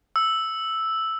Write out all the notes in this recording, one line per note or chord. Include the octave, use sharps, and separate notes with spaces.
E6